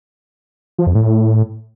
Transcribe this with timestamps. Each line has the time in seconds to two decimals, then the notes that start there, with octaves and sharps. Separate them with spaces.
0.79 F3
0.87 F2
0.95 A2